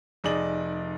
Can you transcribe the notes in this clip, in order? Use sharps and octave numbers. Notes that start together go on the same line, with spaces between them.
F1 D#4 G#4 D5 F#7